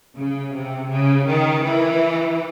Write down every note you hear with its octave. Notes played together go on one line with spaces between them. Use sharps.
C#3
C3
C#3
D#3
E3